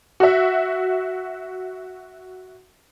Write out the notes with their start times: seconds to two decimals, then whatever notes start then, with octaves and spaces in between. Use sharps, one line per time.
0.20 F#4 E5